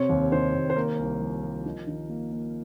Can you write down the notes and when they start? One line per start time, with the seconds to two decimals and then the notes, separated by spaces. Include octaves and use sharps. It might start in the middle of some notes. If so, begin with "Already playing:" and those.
Already playing: C3 C4 C#5
0.09 D#2
0.32 D#3 C5
0.54 D#2
0.70 C5
0.76 A#3 A#4
0.98 C2
1.21 F3
1.43 F3
1.66 D#4
1.87 D#3
2.09 A#3
2.32 A#3